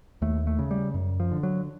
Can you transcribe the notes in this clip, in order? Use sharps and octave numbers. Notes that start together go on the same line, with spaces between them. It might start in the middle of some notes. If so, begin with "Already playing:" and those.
D#2 A3
A3
C#3
G3
F#2
F3
D3
F#3